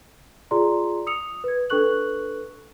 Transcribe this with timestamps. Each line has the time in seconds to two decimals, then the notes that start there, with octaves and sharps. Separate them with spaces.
0.51 F4 G#4 D5 A#5 C6
1.07 D#6 E6 C#7 F7
1.44 B4 G#6
1.70 D4 A4 B4 C#6 F#6 F#7